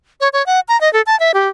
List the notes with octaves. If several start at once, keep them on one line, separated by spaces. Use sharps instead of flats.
C#5
C#5
F#5
A#5
D#5
A4
A5
E5
G4